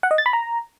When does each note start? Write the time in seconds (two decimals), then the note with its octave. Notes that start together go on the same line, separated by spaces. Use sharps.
0.03 F#5
0.11 D#5
0.18 A6
0.26 B5
0.33 A#5